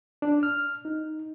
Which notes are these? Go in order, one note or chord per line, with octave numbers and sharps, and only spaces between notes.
D4
F6
D#4